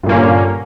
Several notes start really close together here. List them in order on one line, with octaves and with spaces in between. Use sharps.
G2 A#2 A#3 C#4 D3